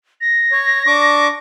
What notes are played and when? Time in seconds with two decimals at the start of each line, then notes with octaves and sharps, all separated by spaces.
0.21 A#6
0.52 C#5
0.87 D4 C#6 D6